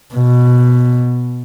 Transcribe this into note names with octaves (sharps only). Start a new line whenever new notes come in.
B2